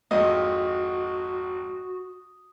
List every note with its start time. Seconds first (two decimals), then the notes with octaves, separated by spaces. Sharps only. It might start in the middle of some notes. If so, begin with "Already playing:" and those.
0.11 G#1 F2 F#4 D#5 D#6